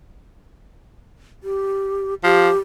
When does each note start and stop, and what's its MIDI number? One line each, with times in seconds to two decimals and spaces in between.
1.43 2.14 67
2.24 2.49 53
2.24 2.58 67